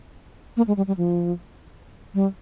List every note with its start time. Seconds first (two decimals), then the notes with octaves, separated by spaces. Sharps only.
0.57 A#3
0.68 G#3
0.77 G3
0.87 G3
0.97 F3
2.15 G3